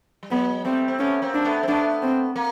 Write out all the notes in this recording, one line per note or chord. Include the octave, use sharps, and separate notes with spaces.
G3
F#3 G#3 B3
G3 A3 C4
C4
A3 B3 C#4
A#3 C4
D4
A3 B3
C4
A3 B3 D4
C4
A#3